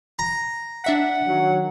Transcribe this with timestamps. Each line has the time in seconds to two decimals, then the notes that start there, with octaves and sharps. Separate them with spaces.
0.19 A#5
0.84 D4 E5 F#5 B6
1.28 D#3 F#3